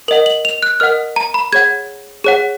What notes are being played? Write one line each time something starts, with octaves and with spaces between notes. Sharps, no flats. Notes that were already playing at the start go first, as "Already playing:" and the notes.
A#4 D#5 F#5 F#7
F#7
F7
F#6
A#4 D#5 F#5 F6
A#5
B5
G#4 C#5 F#5 G#6
G#4 C#5 F#5